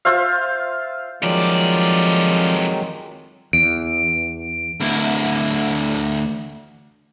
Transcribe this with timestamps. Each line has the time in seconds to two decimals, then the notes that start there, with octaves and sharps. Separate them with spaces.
0.05 F4 C5 E5 F5
1.23 F2 D#3 F3 F#3 G#3 D5
3.53 E2 D7
4.80 D2 E4